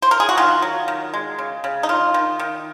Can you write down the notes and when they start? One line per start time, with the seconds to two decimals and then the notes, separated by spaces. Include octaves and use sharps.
0.02 C5
0.11 A#4
0.20 G#4
0.29 F#4
0.37 D#3 F4
0.62 F#3
0.88 D#3
1.14 G#3
1.39 C#3
1.64 C#3
1.83 D#4
1.89 D#3 F4
2.14 D#3
2.40 D#3